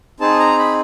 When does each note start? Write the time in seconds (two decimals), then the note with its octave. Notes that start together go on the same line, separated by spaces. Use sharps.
0.20 C4 D#4 G#4 A5
0.39 A#5
0.59 B5